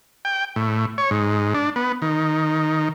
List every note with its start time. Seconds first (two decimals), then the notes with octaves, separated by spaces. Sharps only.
0.25 G5
0.56 A2
0.98 C#5
1.11 G#2
1.55 D4
1.76 B3
2.02 D#3